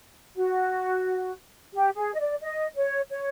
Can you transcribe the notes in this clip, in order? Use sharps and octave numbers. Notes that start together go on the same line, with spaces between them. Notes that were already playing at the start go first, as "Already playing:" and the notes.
F#4
G4
G#4
D#5
D5
D#5
C#5
C#5